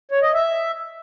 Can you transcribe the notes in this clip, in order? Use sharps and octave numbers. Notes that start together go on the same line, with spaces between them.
C#5
D#5
E5